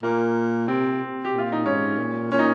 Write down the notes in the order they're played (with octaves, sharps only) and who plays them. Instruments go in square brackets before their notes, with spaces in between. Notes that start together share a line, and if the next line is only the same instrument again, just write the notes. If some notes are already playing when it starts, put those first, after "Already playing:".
[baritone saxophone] A#2 [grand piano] A#3
[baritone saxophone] C3 [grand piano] C4
[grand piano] G4
[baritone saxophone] A#2
[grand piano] F4
D#4
[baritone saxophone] G#2 [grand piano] C#4
[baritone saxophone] A#2
[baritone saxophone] A#2 [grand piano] C#4
[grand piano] D#4